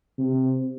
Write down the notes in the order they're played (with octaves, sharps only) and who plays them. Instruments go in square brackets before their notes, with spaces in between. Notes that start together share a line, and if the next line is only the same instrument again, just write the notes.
[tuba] C3